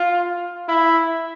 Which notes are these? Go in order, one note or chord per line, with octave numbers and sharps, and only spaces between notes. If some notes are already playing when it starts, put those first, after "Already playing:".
Already playing: F4
E4